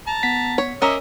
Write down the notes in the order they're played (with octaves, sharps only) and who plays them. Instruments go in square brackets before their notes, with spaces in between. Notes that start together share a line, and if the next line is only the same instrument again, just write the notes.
[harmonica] A5 A#5
[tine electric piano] B3 F#5 B6
[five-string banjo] C#5
[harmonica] A#3 D#5 E5 [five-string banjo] C#4 A#4